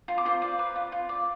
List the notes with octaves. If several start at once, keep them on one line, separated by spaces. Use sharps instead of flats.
F4 C6
D6
F4 C5 C6
D5
B4
F4
F4
D5